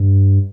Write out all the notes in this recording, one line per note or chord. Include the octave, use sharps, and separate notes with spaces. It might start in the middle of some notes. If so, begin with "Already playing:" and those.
Already playing: G2